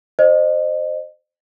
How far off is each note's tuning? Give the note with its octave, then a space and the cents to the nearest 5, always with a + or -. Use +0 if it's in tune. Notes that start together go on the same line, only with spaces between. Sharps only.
C5 +0 D#5 -30